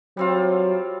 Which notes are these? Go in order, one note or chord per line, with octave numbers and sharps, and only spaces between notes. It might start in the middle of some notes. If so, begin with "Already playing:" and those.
F#3 G3 C4 F4